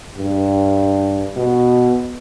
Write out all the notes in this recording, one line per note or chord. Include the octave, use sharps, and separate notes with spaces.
G2
B2